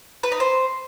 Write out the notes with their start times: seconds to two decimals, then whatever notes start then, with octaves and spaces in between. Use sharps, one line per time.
0.23 B4
0.32 D#4
0.40 C5